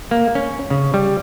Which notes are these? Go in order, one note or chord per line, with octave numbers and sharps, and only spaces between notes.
A#3
C#4
C#3
G3